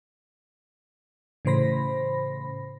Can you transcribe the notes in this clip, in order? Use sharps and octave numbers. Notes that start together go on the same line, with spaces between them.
A2 C#3 E3 C5 B5 A#6